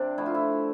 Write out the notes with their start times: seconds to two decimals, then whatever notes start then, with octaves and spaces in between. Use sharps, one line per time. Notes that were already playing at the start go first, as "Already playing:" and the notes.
Already playing: C3 C4 D4
0.18 D3 F3 A3 E4
0.26 F4
0.34 E4